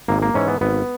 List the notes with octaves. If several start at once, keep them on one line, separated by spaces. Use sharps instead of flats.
G#1 A#3
A#3
G#2 E3 C#4
B3
G#1 B3